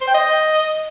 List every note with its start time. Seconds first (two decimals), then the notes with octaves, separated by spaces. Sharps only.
0.01 C5
0.08 G5
0.14 D#5